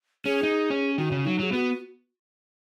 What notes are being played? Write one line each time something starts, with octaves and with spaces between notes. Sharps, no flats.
C#4 G#4
D#4
C#4
D#3 F#4
C#3
F#3 D#4
F#3 G#4
B3 F#4